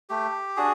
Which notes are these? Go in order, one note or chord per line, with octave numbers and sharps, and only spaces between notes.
A3 G4
D4 F#4 G#4